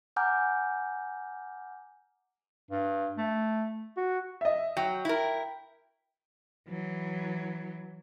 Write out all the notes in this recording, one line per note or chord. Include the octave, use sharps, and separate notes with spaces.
F#5 G#5 A#5 D6 F6 G6
G2
A3
F#4
D#5 E5
F#3 G5
E4 A#4
E3 F#3